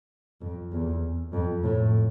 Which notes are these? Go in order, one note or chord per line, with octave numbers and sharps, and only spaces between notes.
F2
E2
F2
A2